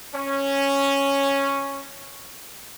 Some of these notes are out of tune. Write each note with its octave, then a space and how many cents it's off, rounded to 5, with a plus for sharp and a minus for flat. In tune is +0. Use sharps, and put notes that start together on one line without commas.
C#4 -5